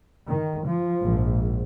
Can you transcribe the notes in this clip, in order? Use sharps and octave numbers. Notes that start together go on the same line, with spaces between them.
D#3
F3
A#1 G#2